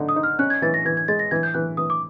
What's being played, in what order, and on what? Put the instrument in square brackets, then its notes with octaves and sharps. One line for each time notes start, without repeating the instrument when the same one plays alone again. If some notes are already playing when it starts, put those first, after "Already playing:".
Already playing: [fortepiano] D3 D#4
[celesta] D#6
[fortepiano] D#4
[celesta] F6
[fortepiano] C#4 [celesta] F#6
[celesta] G#6
[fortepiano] E3 [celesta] A6
[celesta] A#6
[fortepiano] E3 [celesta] G#6
[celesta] G#6
[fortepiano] G#3 [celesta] A6
[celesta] A#6
[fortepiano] E3 [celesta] G#6
[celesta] G6
[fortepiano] E3 [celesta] F#6
[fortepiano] E3 [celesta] D#6
[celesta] D6